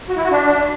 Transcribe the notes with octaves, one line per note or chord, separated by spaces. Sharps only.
F#4
E4
F#4
D4